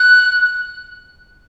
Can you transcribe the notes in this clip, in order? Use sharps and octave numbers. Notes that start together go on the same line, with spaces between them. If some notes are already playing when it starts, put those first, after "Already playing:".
Already playing: F#6